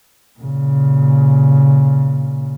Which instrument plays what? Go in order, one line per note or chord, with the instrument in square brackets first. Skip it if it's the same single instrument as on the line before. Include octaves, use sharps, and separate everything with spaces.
[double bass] A#2 C#3